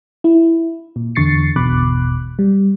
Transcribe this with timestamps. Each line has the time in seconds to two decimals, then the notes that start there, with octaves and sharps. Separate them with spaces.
0.24 E4
0.96 A#2
1.15 E2 D3 C#6 A6 C7 C#7
1.56 G#1 E2 B2 B5 D6 F#6
2.39 G3